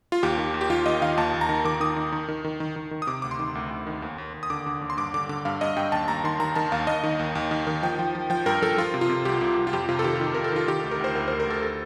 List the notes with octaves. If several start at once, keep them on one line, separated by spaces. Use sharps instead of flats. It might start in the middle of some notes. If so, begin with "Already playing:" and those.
F4
D#2 G4
D#3
D#2
G4
D#2 F4
D#2 D#5
D#3 F5
D#2 A5
D#2
A#5
D#3
D#3 D6
D#3 D#6
D#3
D#3
D#3
D#3
D#3
D#3
D#3
D#6
C3 D6
D2 D6
C6
D#3
D2
D2
D#3
D#2
D#2
D#2
D#6
D3 D6
D3
D#2
C6
G2 D6
D3 D6
D3 D6
G2 F5
G2 D#5
G2 G5
D#2 A5
D#2 A#5
D#3 C6
D#3 A#5
D#3 A5
D#2 F5
D#2 D#5
D#3
D#2
D#2
D#3
D#3
F3 G5
F3
F3
F3 G5
G2 A#4
F3 A4
F3 F4
C3
F4
C3
C2 G4
C2
C2
F4
F2 G4
C3 F4
A4
D#3 G4
D#3 F4
C3 A#4
A4
D#3 F4
D#3 G4
D2 A4
A#4
D2 C5
D2 A#4
D2 C5
A#4
D2 A4
A4